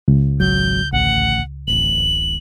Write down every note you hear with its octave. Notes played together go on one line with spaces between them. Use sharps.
C#2
G#1 F#3 G6
A1 D2 F#5
D1 A1 F#7